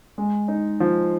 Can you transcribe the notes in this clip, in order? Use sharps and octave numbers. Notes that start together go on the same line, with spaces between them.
G#3
D#4
F3